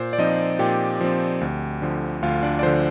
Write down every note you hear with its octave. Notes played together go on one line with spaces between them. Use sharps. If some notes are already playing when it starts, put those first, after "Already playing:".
Already playing: A#2 C5
D5
F3 C4 D#4 D#5
A#2 G4 G5
F3 C4
D2
D3 F3
D2 F4 F5
D4 D5
D5
D3 F3 C5